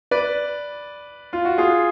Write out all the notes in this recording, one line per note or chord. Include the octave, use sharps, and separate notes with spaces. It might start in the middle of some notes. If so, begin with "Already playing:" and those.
B4 D5
F4
F#4
F4 G#4